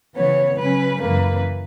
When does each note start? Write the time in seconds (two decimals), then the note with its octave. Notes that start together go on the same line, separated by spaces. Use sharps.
0.16 C#3 E3 B3 C#5
0.58 C#3 F#3 C#4 B4
1.00 F#2 C#3 E3 A#3 B4